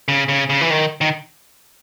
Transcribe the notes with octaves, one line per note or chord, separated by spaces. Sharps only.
C#3
C#3
C#3
E3
D#3
D#3